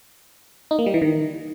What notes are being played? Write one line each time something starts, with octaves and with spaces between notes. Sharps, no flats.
D#4
A#3
G3
E3
D#3